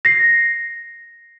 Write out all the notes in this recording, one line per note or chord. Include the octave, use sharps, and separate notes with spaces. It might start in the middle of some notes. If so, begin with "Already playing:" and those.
A#6 C7